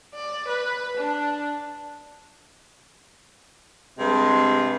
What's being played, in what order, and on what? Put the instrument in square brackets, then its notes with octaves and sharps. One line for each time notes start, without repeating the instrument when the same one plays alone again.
[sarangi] D5
B4
D4
[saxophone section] G2 C3 G#3